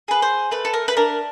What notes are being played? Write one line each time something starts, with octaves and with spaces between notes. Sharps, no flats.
G#4 B4
C5
A3 B4
A4
A#4
B4
D4 A#4